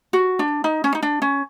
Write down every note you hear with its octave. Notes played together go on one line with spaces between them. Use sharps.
F#4
D4
D#4
C#4
D#4
D4
C#4